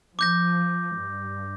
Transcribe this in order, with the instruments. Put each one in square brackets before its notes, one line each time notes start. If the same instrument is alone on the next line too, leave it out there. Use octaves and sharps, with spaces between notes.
[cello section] F3 [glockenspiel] D6 G6 A#6
[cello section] G2